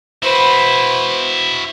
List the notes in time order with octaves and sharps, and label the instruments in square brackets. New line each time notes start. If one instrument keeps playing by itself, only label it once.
[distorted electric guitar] E4 F#4 [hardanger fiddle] B4 C5